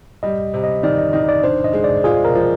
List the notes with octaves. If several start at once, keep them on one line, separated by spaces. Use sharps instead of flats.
G3 D#5
C3
D#5
D#3 D5
D#5
D#3 D#5
D5
D4 C5
D#5
G#3
D5
F4 G#4
A#4
F3